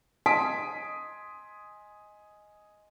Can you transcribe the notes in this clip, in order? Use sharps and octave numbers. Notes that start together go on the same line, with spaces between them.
D#5 G#5 C6 D#6 B6 D7